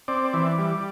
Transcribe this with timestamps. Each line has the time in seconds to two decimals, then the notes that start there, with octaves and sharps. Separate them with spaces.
0.08 C4 D5
0.34 E3
0.58 G3